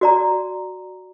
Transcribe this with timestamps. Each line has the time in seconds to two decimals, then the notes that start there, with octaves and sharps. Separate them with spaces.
0.01 F#4 D5 A#5